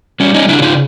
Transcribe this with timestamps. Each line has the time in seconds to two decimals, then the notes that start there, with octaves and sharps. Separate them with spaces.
0.20 G3 C#4
0.34 C#4 D#4
0.49 C#3 D4 E4
0.58 F#4
0.62 D#4 F4